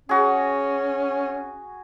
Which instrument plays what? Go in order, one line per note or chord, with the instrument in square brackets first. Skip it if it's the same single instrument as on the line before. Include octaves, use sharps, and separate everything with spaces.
[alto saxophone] C#4 [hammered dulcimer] F#4 G#4